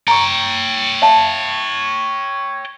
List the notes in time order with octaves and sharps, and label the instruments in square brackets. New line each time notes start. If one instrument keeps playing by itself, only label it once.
[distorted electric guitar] C#5 G5 [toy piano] A#5 C#6
[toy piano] E5 F5 A5